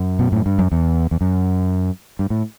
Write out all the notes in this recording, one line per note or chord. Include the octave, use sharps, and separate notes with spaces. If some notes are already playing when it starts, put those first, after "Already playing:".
Already playing: F#2
B2
A2
G2
F#2
E2
E2
F#2
G2
A2